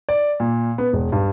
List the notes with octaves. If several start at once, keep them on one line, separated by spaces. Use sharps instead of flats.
D5
A#2
B3
E1
G2